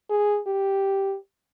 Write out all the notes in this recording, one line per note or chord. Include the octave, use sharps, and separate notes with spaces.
G#4
G4